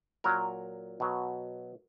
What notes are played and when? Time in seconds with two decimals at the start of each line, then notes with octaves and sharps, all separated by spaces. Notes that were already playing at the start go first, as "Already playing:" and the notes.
0.24 A#2 F#3 A#4
1.00 B2 F#3